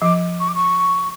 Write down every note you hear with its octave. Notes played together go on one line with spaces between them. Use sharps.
F3 D6
C#6
D6
C#6